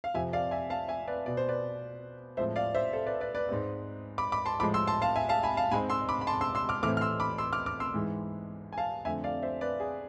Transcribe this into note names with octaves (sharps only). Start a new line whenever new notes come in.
F5
F2 C3 F3 E5 G#5
D5 F5
E5 G#5
F5 A5
E5 G#5
B4 D5
B2 B3 D5
C5
B4 D5
A2 F3 G#3 C4 C5 E5
D5 F5
C5 E5
A4 C5
B4 D5
B4 D5
B4 D5
G#2 G#3 C4
B5 D6
B5 D6
A5 C6
A2 F3 G#3 B5 D6
C6 E6
A5 C6
F5 A5
E5 G#5
F5 A5
G#5 B5
F5 A5
G#2 G#3 C4 G#5 B5
C6 E6
B5 D6
B5
A5 C6
C6 E6
C6 E6
D6 F6
A2 E3 A3 C4 D6 F6
F6
C6 E6
B5 D6
C6 E6
D6 F6
D6 F6
C6 E6
G#2 E3 G#3
G#5
F5 A5
F2 D3 A3 E5 G#5
D5 F5
C5 E5
B4 D5
G#4